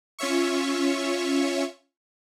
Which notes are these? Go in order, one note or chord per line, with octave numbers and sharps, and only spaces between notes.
C#4 F4 C#5 E5 C#6